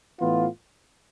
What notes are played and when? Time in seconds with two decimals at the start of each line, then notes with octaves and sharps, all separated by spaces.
0.19 A2 E3 B3 F4